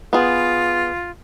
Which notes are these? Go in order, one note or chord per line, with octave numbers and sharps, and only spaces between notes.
B3 F4 G#4